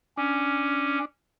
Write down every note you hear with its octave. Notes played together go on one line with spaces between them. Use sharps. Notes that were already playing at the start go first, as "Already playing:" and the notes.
C#4 D4